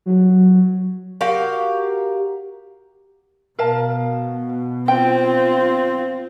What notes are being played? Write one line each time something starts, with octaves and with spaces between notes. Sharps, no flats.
F#3
F#4 G4 A#4 F5
B2 A#4 F5 A5
C4 F4 G5